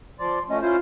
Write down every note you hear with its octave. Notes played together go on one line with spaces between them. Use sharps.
F3 D5 C6
F3 A3 C#4 D#5
C#4 E4 F4 C5